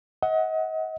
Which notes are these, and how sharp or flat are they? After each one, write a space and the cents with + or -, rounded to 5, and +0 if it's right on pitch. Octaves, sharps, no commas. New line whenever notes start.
D#5 +35 F#5 +0